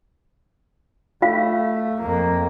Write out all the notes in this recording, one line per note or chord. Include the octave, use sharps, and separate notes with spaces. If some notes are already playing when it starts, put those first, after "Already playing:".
A3 F4 F5
F2 A#3